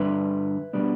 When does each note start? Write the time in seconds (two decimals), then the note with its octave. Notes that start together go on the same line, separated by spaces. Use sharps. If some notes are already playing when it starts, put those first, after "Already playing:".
Already playing: G2 D3 G3 D4 B4 E5
0.73 B2 G3 B3 D4